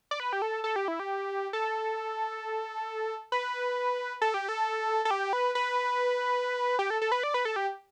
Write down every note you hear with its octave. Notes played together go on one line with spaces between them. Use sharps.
D5
B4
G4
A4
A4
G4
E4
G4
A4
B4
A4
G4
A4
A4
G4
B4
B4
G4
A4
A4
B4
D5
B4
A4
G4